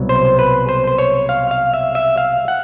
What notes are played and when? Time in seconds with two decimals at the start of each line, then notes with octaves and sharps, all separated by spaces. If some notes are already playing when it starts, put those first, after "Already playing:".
Already playing: C2 B2 F#3
0.09 C5
0.39 B4
0.69 C5
0.88 C5
0.98 C#5
1.29 F5
1.51 F5
1.74 E5
1.95 E5
2.18 F5
2.48 F#5